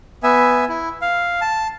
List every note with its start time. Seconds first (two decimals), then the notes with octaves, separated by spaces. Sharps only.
0.23 B3 E5 G#5
0.69 E4
1.02 F5
1.41 A5